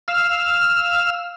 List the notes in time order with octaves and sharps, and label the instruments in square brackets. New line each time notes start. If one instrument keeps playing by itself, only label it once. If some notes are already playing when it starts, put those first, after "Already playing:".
[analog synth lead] F5 [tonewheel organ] E6 F6